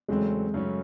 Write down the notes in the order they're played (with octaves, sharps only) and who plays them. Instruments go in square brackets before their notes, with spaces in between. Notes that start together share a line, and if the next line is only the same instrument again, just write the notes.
[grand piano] E2 C#3 F#3 A3 C4 [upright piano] G#3
[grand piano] F#2 C#3 F#3 A3 C#4